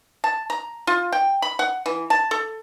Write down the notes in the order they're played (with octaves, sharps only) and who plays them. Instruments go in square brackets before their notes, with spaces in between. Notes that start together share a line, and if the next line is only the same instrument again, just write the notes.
[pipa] A5
A#5
F4
G5
B5
F#5
E3
A5
A4